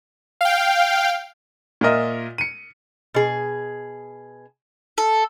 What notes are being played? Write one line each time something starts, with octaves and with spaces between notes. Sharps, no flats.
F5 G5
A#2 F4 A#4 D#5 E5
C#7 D#7
B2 G#4
A4